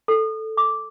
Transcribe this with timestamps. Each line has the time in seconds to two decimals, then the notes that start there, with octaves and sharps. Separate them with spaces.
0.08 A4
0.57 D6